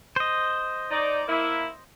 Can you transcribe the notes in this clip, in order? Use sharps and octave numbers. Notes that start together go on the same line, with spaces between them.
C5 D#5
D#4 D5
A#3 E4